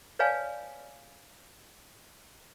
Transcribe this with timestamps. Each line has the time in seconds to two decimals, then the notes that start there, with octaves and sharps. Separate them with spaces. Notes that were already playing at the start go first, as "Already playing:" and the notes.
0.19 B4 C#5 D5 F5 G#5 A5